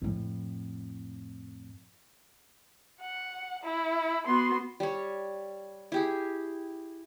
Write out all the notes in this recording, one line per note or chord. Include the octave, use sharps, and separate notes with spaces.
F2 A2
F#5
E4
B3 F#4 C6
G3 C#5
E4 G4 G#4